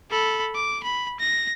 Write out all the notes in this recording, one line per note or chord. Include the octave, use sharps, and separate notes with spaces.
A4 B5
D6
B5
A#6